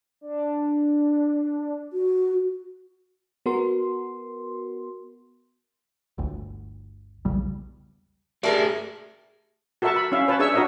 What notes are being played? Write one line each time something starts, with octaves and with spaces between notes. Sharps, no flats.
D4
F#4
B3 F#4 A#4 C6
G1 D2
B1 E2 C#3 G3
A3 G4 G#4 A#4 D5 E5 A5
F#4 A4 A#4 E5 A5 C#6
B5
C#4 E4 E5 F5
B4 C#5 A5 B5
D4 G#4 C#5 E5 C#6 E6
D4 F#4 A#4 C#5 D#5 E5